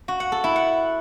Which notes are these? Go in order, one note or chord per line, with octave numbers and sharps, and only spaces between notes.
F#4
F#5
A4
E4
F#5